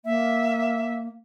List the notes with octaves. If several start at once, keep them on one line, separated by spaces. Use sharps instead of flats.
A#3 E5